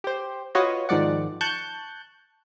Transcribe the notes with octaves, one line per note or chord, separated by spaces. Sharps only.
G4 C5
F4 F#4 B4 C#5 D#5
G#2 D#3 F3 G#3 D5 F#5
A5 C#6 F#6 G6